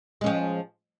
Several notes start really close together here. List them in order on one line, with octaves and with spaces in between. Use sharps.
G#3 C#4 F3